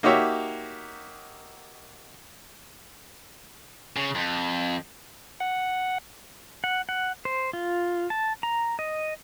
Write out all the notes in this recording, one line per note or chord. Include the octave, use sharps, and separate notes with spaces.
A#3 D#4 F#4 G4 C#5 E5
C#3
F2
F#5
F#5
F#5
C5
F4
A5
A#5
D#5